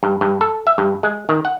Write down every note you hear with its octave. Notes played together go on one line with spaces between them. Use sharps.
G2
G2
A4
E5
G2
G#3
D#3
F#5